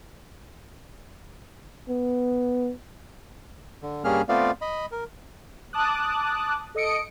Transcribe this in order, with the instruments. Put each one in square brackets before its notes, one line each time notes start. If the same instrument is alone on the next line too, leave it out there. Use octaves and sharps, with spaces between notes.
[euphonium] B3
[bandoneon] D3
G2 G3 A#3 C#4 G#4 F6
A3 B3 C4 F4 D5 F5
D#5 B5
A#4
[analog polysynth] A5 D6 D#6 F#6
A4 D#5 D#6 C#7 D7